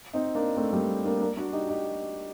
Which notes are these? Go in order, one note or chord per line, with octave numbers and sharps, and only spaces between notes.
C4 D#4
A#3 D4
A3 C4
G3 A#3
A#3 D4
A#3 D4
D4 F#4
D#4 G4
D#4 G4